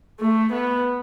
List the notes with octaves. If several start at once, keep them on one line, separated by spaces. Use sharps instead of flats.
A3
B3